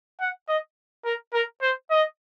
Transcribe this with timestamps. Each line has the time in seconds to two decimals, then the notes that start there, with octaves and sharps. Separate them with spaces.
0.21 F#5
0.48 D#5
1.05 A#4
1.33 A#4
1.62 C5
1.91 D#5